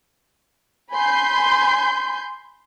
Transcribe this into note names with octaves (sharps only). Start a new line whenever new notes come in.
G#5 B5 C6 G6